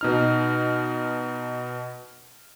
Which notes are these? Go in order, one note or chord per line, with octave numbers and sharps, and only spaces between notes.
B2 D#4 F6